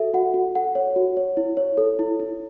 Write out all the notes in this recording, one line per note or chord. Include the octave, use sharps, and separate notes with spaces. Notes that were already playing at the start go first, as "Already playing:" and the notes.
Already playing: F#4 A4 E5
F#4 F#5
F#4
A4 F#5
C#5
F#4
C#5
E4
C#5
A4
E4
E4